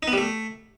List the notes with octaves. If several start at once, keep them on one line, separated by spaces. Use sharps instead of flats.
D#4
B3
G3
A3